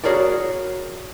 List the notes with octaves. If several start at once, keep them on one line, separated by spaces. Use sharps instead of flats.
F#4 G#4 A#4 C#5 D5